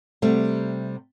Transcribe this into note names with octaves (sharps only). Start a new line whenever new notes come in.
C3 G3 A3